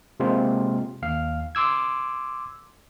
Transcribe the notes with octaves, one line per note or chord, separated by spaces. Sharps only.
C3 G#3 A#3 C4 F4
D#2 F5
C6 D6 E6 G#6